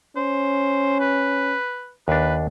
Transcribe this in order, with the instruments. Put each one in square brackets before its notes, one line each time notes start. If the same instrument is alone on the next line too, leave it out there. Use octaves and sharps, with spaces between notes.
[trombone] C#4 [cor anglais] C5
[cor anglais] B4
[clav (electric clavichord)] D#2 D4 [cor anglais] B4